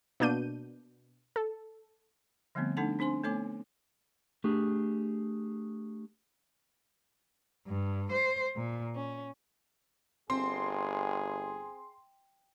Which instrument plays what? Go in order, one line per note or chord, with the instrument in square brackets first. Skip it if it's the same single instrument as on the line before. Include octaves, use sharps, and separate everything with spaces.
[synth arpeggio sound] B2 A#3 D4 G6 D#7
A4
[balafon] D3 F3 G3 A3 B3 C4
A3 D4 D#4 A4 F#5 A5
C4 D4 C5 G#5 C6
A3 B3 A4 C#5 G#5 D6
[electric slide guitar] A3 D4 G4 G#4
[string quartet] G2
C5
A#2
C#4
[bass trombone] G1 [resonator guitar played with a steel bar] C4 [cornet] G#4 [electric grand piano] C6